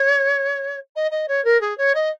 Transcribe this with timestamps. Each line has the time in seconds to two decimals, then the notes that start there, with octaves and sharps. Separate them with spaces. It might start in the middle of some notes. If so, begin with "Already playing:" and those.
Already playing: C#5
0.95 D#5
1.11 D#5
1.28 C#5
1.44 A#4
1.61 G#4
1.77 C#5
1.94 D#5